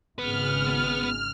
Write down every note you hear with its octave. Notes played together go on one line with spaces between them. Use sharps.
G#1 C#3 B3 B4 F6